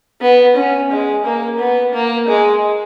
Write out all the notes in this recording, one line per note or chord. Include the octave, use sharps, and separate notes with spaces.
B3
C#4
G#3
A#3
B3
A#3
G#3